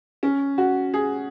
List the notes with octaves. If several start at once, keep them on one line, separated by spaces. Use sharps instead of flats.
C#4
F#4
G#4